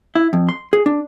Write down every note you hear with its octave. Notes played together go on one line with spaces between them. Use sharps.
E4
F2
C6
G#4
D4